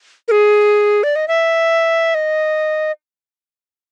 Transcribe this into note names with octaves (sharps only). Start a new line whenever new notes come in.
A#4
G#4
D5
D#5
E5
D#5